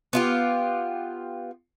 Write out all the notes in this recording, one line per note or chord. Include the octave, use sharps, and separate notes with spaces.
B3 F4 G4